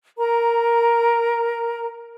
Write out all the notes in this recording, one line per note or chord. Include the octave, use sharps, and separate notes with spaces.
A#4 A#5